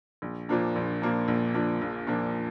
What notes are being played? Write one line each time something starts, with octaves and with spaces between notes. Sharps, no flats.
A#1
A#2 F3 A#3 D4
A#1
A#2 F3 A#3 D4
A#1
A#2 F3 A#3 D4
A#1
A#2 F3 A#3 D4